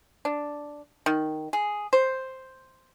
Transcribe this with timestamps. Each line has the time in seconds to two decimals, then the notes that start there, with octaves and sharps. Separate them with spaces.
0.25 D4
1.06 D#3
1.53 G#4
1.93 C5